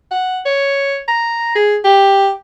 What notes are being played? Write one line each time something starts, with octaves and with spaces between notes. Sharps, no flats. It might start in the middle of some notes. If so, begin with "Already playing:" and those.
F#5
C#5
A#5
G#4
G4